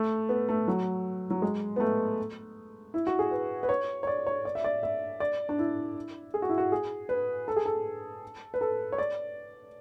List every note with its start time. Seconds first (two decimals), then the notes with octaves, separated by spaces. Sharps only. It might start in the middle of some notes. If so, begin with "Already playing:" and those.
Already playing: A3
0.29 B3
0.49 A3
0.68 F#3
1.30 F#3
1.42 G#3
1.76 B3
1.80 A3
2.94 E4
3.07 F#4
3.19 G#4
3.31 B4
3.63 B4
3.69 C#5
4.03 C#5
4.07 D5
4.27 C#5
4.45 D5
4.55 E5
4.64 D5
4.83 E5
5.20 D5
5.49 D4
5.59 E4
6.34 G#4
6.42 F#4
6.49 E4
6.58 F#4
6.72 G#4
7.09 B4
7.48 A4
7.56 G#4
7.66 A4
8.54 B4
8.61 A4
8.92 C#5
8.98 D5